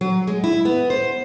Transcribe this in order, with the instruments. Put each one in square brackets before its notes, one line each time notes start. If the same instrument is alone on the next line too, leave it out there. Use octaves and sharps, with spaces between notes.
[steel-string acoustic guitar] F#3
G#3
E4
B3
C5